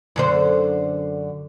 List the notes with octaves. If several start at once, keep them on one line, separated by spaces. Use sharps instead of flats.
F#2 D3 C5